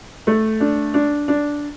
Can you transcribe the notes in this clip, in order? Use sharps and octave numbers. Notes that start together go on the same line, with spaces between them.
A3
D4
D4
D4